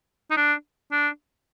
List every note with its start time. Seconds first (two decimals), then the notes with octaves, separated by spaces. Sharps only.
0.31 D#4
0.37 D4
0.92 D4